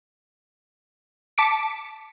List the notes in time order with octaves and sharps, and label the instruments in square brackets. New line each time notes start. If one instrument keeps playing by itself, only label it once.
[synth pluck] A5 D6 B6 C#7 D7